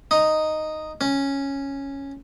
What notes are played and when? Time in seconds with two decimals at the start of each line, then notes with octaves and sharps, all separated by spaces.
0.11 D#4
1.01 C#4